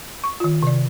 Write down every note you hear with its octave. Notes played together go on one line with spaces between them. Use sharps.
C#6
D#3 F4
C3 D5